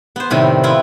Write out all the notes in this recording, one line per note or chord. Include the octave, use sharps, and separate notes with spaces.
B3 C5
A2 C3 D#3 G3
B3 E4 F4